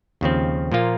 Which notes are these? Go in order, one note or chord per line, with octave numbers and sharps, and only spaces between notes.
D#2 C#3 F3 C4
A#2 F3 A#3 F4